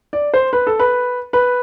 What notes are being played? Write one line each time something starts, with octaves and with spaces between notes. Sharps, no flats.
D5
C5
B4
A4
B4
B4